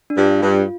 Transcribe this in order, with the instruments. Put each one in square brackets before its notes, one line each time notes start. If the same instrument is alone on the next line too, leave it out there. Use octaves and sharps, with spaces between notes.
[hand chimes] D4
[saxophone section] G2 [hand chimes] F4
[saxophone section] G2